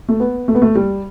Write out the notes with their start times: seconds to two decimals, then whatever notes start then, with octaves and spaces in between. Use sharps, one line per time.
0.09 A3
0.20 B3
0.48 A3
0.55 B3
0.62 A3
0.75 G3